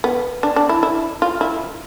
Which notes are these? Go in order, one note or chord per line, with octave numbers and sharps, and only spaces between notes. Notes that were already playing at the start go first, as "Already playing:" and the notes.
B3
D4
D4
E4
E4
F4
E4